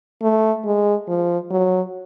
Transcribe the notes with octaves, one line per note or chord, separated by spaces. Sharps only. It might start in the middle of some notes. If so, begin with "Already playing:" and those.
A3
G#3
F3
F#3